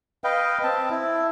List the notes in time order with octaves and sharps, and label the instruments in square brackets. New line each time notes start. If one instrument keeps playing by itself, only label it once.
[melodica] B4 D#5 F5 G5
C4 A5
E4